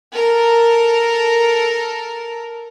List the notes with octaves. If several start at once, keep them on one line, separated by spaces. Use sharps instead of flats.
A4 A#4